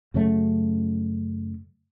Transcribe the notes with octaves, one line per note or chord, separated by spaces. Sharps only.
F#2 C#3 F#3 A3